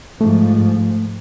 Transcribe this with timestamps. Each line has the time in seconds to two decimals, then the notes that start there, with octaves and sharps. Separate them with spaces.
0.21 G#2 F3 A3